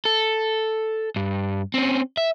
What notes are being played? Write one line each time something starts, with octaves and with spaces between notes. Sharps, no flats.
A4
G2
C4 C#4
E5